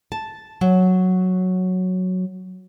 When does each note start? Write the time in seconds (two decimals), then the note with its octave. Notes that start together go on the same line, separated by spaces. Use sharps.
0.12 A5
0.61 F#3